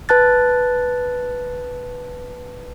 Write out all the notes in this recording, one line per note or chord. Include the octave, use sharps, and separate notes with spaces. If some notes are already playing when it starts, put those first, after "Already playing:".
B4 A5 F#6 A6